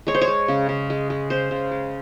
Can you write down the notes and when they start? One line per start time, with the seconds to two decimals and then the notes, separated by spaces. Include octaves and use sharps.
0.07 G#3 C#5
0.15 C5
0.21 C#5
0.27 G#3
0.48 C#3
0.69 C#3
0.90 G#3
1.10 G#3
1.30 C#3 C5
1.51 C#3
1.71 G#3